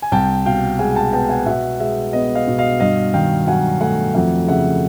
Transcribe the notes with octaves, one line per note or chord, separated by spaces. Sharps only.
G#5
C2 G5 A5
B2 F5 G5
G#3 F#5 G#5
G5 A5
B3 G5 A5
F#5 G#5
B2 E5 F#5
G#3 E5
B3 D#5
D#5 F5
B2
D#5 F5
G2 D#5 F5
D#3 F5 G5
F#3 F#5 G#5
A3 F#5 G#5
F2 E5 F#5
C#3 E5 F#5